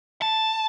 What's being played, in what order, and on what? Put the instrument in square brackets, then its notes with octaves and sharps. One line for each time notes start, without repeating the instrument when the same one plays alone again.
[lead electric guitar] A5